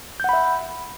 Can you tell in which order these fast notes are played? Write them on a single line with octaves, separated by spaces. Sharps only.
G6 F#5 B5 E5